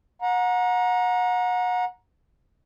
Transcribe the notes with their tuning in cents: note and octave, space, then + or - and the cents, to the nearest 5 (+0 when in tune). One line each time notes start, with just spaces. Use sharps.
F#5 -30 A#5 +15